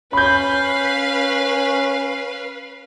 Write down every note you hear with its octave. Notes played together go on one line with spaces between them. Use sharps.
C#4 B4 F5 B5 G6